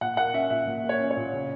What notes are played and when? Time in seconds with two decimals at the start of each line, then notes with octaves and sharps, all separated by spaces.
0.01 A#2 F#5
0.17 A#3 F#5
0.34 C#4 E5
0.50 A#2 E5
0.67 A#2
0.84 A#3
0.89 C#5
1.00 C#4
1.11 C#5
1.17 A#2
1.33 C#3